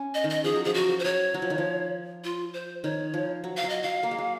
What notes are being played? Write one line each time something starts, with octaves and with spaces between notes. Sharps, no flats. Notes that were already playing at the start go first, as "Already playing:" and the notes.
Already playing: C#4
D#5
D#3
D#5
F3 G#4
F#3
F3 G#4
F#3 F#4
F3
C5
F#3 C#5
F#3
F3
D#3
F3
F4
C5
D#3 C#5
F3
F#3
F5
F#3
D#5
F#3 F5
A#3
G#3
F#3